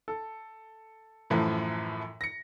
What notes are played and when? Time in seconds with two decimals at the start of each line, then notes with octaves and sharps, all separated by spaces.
0.08 A4
1.30 F#2 A2 E3 F3 A3
2.21 A#6 C#7